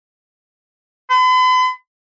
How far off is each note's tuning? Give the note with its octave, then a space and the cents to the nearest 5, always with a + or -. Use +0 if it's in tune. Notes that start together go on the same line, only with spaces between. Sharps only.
B5 +45